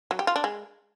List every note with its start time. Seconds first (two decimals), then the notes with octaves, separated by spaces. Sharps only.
0.11 F#3
0.19 G4
0.27 F4
0.36 D4
0.44 G#3